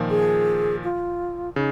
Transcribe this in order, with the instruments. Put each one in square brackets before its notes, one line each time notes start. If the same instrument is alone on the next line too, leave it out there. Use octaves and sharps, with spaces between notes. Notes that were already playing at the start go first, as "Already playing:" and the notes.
Already playing: [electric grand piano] A#2 D#3 F3
[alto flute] G#4
F4
[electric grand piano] C#3 [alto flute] D#4